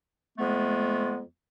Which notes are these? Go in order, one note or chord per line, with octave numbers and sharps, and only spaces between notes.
F2 G#3 A3 B3